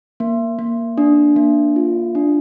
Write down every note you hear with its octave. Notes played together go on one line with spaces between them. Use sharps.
A#3
A#3
D4
A#3
F4
D4